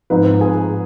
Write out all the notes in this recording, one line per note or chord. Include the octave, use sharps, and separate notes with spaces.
G#2 F3 C4 D#4 B4
G#4